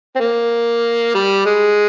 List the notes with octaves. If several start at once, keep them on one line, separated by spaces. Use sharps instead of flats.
C4
A#3
G3
G#3